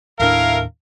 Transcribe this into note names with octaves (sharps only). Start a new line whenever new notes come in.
D#2 A2 A3 D4 E4 A#4 F5